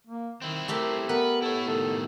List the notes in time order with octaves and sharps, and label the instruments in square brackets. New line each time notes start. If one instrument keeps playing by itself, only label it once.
[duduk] A#3
[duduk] D#3 [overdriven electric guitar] C4 E4
[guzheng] A3 G4 A4 [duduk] A#4
[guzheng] B3 [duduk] A#4 [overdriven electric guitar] B4
[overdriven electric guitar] E4 C#5 [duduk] A4
[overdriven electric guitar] A2 D#3 [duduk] A4